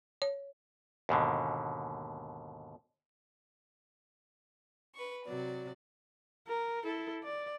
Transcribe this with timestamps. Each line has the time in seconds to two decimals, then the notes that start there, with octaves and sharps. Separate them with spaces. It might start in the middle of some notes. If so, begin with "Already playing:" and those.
0.22 C#5
1.09 D#2 G#2 B2 D3
4.95 B4 C#6
5.25 C3 F#3 D5
6.47 A#4
6.84 E4 A4
7.23 D5